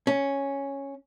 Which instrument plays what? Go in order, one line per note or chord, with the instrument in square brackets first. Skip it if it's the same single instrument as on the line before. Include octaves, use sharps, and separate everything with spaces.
[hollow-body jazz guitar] C#4